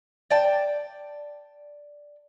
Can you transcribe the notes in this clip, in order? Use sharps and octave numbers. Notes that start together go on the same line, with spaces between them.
D5 G5 A5